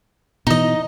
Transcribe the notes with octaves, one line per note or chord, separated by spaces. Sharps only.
B2 E3 D#4 D#5